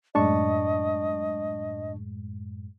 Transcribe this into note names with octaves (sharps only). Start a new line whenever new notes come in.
F#2 A2 G#3 D4 D#5 A5 C#6